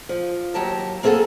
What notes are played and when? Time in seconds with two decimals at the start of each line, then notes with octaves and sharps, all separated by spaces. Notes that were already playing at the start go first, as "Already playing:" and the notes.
0.09 F3
0.54 D#2 F#3 G4 A#4 A5
1.03 A#3 C4 F4 G#4 A4 F#5